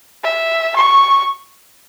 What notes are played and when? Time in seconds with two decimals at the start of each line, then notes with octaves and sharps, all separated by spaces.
0.24 E5
0.76 C#6